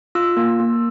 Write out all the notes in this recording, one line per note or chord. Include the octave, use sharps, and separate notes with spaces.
F4 E6
A#3
A#3